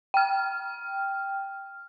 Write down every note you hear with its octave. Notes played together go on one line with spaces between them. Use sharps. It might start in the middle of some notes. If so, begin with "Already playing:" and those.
G5 F6